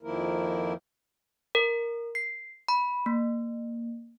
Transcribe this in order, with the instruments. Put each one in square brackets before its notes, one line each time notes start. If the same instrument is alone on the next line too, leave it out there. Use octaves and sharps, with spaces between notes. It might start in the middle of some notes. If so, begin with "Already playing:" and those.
[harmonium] F2 D#3 F3 A#3 E4 A#4
[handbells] A#4
C7
B5
A#3